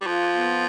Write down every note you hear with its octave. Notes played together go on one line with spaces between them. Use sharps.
G3
F3 F4
B3